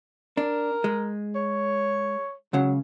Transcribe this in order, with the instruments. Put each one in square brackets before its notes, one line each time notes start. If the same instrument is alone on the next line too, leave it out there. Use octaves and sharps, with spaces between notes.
[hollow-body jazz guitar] D4 [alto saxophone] A#4
[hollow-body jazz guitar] G#3
[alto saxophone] C#5
[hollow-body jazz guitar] C#2 C#3 [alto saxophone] F#3